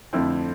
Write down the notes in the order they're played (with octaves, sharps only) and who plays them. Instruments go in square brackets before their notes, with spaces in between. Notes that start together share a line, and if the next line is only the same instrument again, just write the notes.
[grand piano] F2 D3 A3 C4 E4